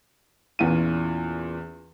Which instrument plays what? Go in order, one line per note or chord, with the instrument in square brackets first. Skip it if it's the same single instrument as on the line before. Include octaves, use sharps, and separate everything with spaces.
[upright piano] E2 A#2 E3 C#4 F4 D#7